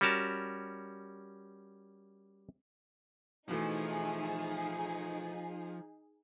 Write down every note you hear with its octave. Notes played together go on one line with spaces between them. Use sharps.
G3 C#4 F#4 A#4 A5
B2 E3 F3 A3 D#4 G#4